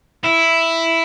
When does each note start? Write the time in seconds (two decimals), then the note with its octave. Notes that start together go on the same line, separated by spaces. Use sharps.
0.24 E4